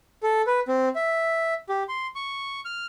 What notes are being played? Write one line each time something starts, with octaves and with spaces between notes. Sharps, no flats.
A4
B4
C4
E5
G4
C6
C#6
F6